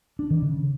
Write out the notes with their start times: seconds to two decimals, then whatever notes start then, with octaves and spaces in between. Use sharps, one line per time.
0.19 D4
0.30 D#3
0.42 C#3